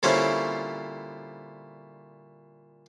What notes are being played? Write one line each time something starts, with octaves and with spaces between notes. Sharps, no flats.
A#2 D3 G3 C4 C#4 E4